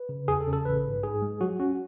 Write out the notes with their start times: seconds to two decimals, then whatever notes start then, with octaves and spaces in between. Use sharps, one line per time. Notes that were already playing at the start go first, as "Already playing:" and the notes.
Already playing: B4
0.09 C#3
0.28 E2 G#4
0.40 A4
0.47 C#3
0.53 A4
0.65 A1 B4
0.84 G#2
1.03 G#2 G#4
1.22 G#3
1.41 F#3 F#4
1.60 C#4 F#4